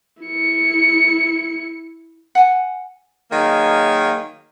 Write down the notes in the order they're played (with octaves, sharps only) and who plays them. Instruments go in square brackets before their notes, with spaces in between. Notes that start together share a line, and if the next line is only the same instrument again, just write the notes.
[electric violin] E4 C#7
[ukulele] F#5 G#5
[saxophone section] D#3 F#3 A#3 G#4